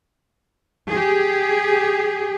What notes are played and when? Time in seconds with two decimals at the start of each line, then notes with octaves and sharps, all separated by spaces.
0.90 G4 G#4